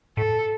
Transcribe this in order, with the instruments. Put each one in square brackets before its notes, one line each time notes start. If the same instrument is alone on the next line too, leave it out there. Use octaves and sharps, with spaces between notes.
[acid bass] A2 [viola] A4